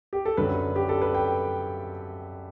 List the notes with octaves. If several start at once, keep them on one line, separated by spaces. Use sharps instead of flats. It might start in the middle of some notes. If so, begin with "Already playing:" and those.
G4
A4
F#2 D3 F#3 B4
G4
A4
B4
G5